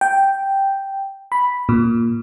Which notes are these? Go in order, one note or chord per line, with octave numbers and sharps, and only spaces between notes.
G5
B5
A#2